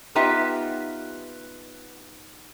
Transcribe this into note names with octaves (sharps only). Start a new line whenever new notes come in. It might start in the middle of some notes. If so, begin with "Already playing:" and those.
B3 D#4 F4 G4 B4 E5